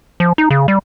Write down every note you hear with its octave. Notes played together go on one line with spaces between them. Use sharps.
F3
D#4
C#3
G3